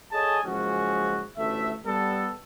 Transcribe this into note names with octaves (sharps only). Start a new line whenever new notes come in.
G#4 A4 C#5 D#5 G#5 A5
F#1 F3 G#3 C#4 F#4
A1 D2 A3 E5
G3 B3 A4